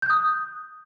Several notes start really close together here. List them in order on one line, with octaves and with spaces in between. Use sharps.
G6 F#6 D#6